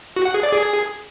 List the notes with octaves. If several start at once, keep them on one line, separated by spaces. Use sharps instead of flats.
F#4
F#5
G#4
D5
G#4